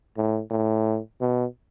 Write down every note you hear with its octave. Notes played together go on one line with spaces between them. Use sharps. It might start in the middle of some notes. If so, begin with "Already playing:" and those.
A2
A2
B2